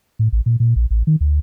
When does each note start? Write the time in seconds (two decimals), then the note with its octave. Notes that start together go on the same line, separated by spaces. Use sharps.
0.19 A2
0.32 A1
0.46 A#2
0.60 A#2
0.76 A#1
0.90 A1
1.07 D#3
1.21 D2